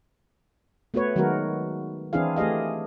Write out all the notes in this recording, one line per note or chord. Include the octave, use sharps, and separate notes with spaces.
A3 B3 F#4 B4 C#5
D#3 F#3 G#3 B3 F#4 A#4
E3 C4 D4 E4 G#4 F5
A3 G4 G#4 D#5 F5